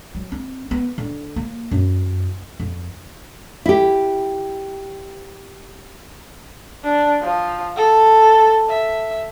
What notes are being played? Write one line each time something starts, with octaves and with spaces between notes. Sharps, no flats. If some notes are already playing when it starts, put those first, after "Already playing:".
F#3
C4
B3
D3
A#3
F#2
F2
E4 G4
D4
F3
A4
E5